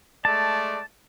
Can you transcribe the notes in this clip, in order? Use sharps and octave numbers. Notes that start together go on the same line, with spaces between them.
G#3 A3 D5 A5